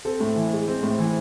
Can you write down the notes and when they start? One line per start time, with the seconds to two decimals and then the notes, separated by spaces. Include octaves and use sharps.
0.05 C4 A4
0.20 A2
0.36 E3
0.52 G#3
0.68 C4
0.83 A2
0.99 E3